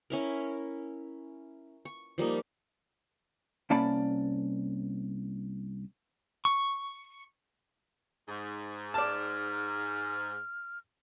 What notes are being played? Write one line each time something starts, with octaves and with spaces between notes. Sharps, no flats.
C#4 E4 A#4
C#6
F3 G3 A#3 D#4
C2 A#3 C#4 D5 A5 B5
C#6
G#2
D5 A5 F6